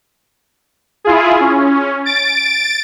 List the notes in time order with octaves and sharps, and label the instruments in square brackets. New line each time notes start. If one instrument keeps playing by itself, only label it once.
[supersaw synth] E4 F4 G#4
C#4
A6 D7